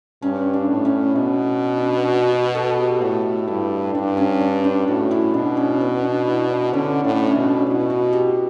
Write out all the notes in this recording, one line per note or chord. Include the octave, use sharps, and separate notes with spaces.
G2 C#4
D4
A2
C#4
B2 B3
D4
F#4
F#4
A4
G4
A2 F#4
G2 E4
G2 D4
C#4
D4
D4
A2 F#4
E4
B2 D4
C#4
B3
D4
E4
D4
D3 C#4
A2 D4
C#4
B2 D4
B2 E4
F#4
G4